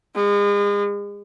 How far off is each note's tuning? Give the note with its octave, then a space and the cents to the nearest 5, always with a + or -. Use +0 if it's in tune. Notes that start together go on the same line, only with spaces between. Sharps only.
G#3 -35